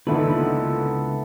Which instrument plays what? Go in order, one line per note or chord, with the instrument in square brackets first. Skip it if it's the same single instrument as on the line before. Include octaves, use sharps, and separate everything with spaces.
[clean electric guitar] C#2 B4 [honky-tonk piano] A#2 D3 D#3 [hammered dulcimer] B3 E4 A4